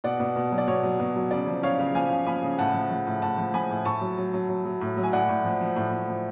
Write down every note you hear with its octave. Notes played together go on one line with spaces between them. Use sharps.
B2 D5 F#5
B2
B2
F#3
D5
B2 C#5
F#3
B2
F#3
C#3 D5
F3
C#3 C#5 F5
C#3
F3 F5 G#5
C#3
F3 G#5 B5
C#3
A2 F#5 A5
F3
F3
A2
A2 F#5 A5
F3
F3 G#5 B5
A2
A2 A5 C#6
F#3
F#3
F#3
F#3
F#3
A2
F#3
G#5
A2 D5 F#5
A2
F3
F3
A2
A2
F3